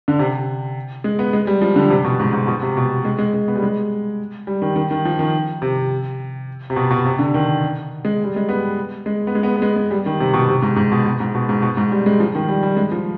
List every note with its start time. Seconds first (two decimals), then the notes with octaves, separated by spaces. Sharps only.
0.08 D3
0.19 C3
1.04 G#3
1.19 B3
1.33 G#3
1.47 G3
1.62 F3
1.76 D3
1.90 C3
2.04 B2
2.20 G#2
2.33 G#2
2.47 B2
2.62 C3
2.77 B2
3.05 G#3
3.19 G#3
3.34 G#3
3.48 B3
3.56 G3
3.63 G#3
4.47 G3
4.62 D#3
4.76 D#3
4.91 D#3
5.05 F3
5.19 D#3
5.62 C3
6.70 C3
6.76 B2
6.90 B2
7.05 C3
7.19 D3
7.34 D#3
8.05 G#3
8.24 G3
8.36 G#3
8.48 B3
9.06 G#3
9.27 B3
9.35 G#3
9.43 B3
9.56 B3
9.62 G#3
9.76 G#3
9.91 G3
10.06 D#3
10.20 C3
10.34 B2
10.48 C3
10.62 G#2
10.76 G#2
10.92 B2
11.05 B2
11.20 G#2
11.35 B2
11.49 G#2
11.62 B2
11.77 G#2
11.92 G3
12.06 G#3
12.20 F3
12.35 D#3
12.48 G3
12.63 G3
12.77 G#3
12.92 F3